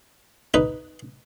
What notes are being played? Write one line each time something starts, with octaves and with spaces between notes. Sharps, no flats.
D#4 B4